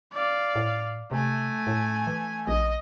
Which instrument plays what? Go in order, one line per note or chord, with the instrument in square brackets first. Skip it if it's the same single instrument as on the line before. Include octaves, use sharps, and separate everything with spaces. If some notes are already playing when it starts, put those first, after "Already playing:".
[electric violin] D5 F5
[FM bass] A2
[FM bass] C3 [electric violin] A3 G#5
[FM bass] A2
E3
[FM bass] A#1 [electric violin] D#5